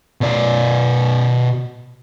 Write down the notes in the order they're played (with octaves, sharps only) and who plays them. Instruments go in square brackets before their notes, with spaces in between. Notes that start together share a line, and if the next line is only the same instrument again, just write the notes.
[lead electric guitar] B2 D5